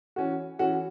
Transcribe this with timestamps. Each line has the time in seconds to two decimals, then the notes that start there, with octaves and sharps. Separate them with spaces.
0.16 E3 C#4 F#4
0.59 E3 C#4 F#4